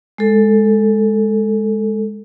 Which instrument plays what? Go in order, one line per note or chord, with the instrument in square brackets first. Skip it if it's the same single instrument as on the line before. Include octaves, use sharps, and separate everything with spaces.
[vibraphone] G#3 A4